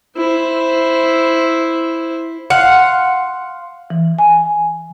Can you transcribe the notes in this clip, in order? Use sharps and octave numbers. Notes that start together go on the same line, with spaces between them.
E4 C5
F5 F#5 C6 F#6
E3
G#5